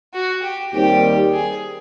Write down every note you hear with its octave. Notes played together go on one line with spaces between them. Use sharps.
F#4
G4
D#2 D#3 G3 C4 G4
G#4